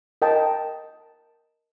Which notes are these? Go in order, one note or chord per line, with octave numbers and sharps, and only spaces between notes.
A#4 D#5 G5 A5